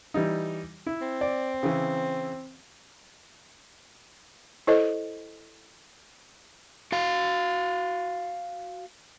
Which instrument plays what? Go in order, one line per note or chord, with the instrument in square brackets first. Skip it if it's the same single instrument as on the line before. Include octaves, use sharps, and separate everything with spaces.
[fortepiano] E3 G3 D#4
E4
[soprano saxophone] C4
[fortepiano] D5
C#3 E3
[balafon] E4 A4 C5 C#5 D#5
[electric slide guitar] F#4 F5